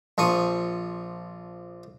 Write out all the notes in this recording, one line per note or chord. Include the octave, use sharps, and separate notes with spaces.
A#1 F3 C#6 D#6